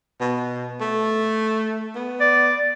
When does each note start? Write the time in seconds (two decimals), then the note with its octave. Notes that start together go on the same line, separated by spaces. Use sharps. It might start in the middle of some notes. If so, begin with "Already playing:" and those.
0.21 B2
0.80 A3
1.95 B3
2.21 D5